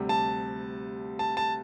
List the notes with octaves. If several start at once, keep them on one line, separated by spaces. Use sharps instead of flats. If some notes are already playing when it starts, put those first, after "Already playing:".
Already playing: D2 C3 G3
A5
A5
A5